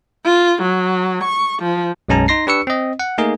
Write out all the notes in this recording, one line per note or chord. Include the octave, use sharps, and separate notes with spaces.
F4
F#3
C#6
F3
B1 F#2 G#3 C#4 A5 A#5
D#4 C6 A#6 C7
D4 G4 B4 C#6 E6 C#7
C4 D#5
F#5
A3 A#3 D#4 G#4 A#4